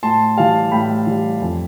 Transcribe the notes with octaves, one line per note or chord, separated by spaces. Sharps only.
A2 A5 C6
E3 G3 F5 A5
A2 G5 B5
E3 G3
F2